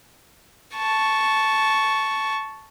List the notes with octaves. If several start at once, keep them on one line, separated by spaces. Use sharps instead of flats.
A5 C#6